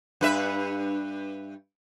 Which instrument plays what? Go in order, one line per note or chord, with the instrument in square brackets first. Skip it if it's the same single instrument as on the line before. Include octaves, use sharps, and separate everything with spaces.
[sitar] G2 B4 E5